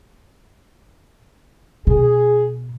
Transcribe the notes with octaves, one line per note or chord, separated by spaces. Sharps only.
B2 G#4